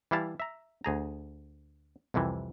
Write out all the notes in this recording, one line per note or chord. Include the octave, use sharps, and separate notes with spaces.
E3 G3 E4 F5 A5
E5 A#5
D2 G#4 A#5
C2 F2 C3 E3